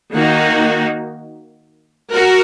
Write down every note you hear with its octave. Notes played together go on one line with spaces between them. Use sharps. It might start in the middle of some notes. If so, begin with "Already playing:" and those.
D#3 A#3 D#4 F#4
F#4 A#4